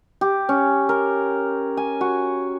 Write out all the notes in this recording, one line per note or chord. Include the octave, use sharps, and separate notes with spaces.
G4
C#4
A#4
G#5
F#4